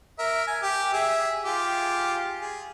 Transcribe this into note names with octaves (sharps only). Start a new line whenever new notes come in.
A#4 E5
G#5
G4
G#4 E5
F4 G4 G#4
G#4